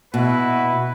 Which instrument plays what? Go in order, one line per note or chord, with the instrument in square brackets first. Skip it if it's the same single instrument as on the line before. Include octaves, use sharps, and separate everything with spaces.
[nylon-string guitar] B2 [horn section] E4 F#4 B4